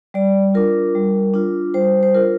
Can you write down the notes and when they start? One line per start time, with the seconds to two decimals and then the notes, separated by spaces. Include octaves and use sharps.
0.14 G3 D5
0.54 D4 F4 A#4
0.95 G3
1.34 D4 F4
1.74 G3 C5
2.03 C5
2.15 D4 F4 A#4